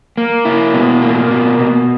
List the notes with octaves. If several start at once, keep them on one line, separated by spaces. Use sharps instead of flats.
A#3
E4
B2
A#3
B2
B2